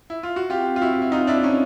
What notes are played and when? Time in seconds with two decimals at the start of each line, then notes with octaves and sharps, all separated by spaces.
0.10 E4
0.23 F4
0.36 F#4
0.50 C4 F4 G4
0.76 F4
0.82 E4 F#4
1.02 E4
1.12 D#4 F4
1.27 D4 E4
1.43 C#4 D#4